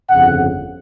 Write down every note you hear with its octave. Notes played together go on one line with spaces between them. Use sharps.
G1 F2 C#3 F#5